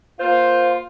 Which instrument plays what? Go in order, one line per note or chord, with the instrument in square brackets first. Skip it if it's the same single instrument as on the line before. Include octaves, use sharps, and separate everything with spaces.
[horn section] A#3 F4 [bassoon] C5